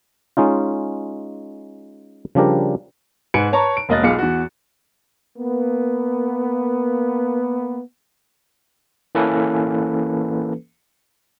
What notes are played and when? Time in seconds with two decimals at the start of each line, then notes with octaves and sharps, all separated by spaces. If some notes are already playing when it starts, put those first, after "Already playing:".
0.37 G#3 C#4 D#4 F4
2.35 C#3 F3 G3 D4 G4 A#4
3.34 G#2 B4 G#5 C#7 D7
3.52 B4 C#5 A5 A#5 C#6
3.77 D7
3.89 E1 A#3 D#5 F#6 A6
4.03 B1 F4 G#4 D6 C#7
4.19 E2 F#4
5.37 A#3 B3
9.15 E3 A#3 C#4 A4 B4